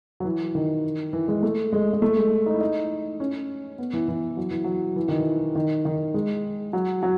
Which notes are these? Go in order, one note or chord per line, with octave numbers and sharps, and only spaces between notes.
F#3
E3
D#3
E3
G#3
A3
G#3
G#3
A3
G#3
D#4
E4
D#4
C#4
B3
E3
E3
F#3
E3
F#3
E3
D#3
E3
D#3
D#3
G#3
F#3
F#3